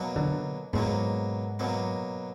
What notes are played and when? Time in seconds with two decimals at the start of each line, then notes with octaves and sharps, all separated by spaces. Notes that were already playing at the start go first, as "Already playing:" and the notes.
Already playing: B2 F#3 A#3
0.16 D3
0.73 G#2 B2 F#3 A#3
1.59 B2 F#3 A#3